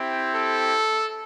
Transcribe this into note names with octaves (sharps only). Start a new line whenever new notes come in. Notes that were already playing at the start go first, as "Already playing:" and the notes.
Already playing: C4 E4 G4
A4